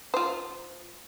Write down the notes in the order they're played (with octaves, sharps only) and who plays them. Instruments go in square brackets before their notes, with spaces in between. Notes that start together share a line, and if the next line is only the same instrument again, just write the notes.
[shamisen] F4 C5